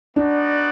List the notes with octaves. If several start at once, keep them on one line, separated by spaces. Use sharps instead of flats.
B3 D4 D#4 F#4 D5 F#5